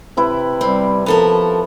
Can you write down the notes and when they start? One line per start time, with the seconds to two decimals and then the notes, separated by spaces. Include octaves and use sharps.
0.17 C3 E4 B4
0.61 G3 C4
1.06 F3 B3 A4 A#4 B5